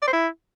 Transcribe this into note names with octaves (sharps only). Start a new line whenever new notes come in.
D5
C5
E4